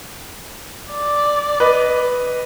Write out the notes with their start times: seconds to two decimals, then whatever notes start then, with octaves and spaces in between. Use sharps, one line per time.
0.91 D5
1.60 B4 D#5